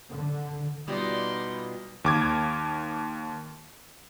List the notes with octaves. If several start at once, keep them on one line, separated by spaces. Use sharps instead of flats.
D3
B2 G3 D#4 F4 G4 D5 D#5 C6
D#2 D6 G#6